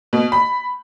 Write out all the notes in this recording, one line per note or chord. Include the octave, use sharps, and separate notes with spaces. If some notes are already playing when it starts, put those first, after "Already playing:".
B2
B5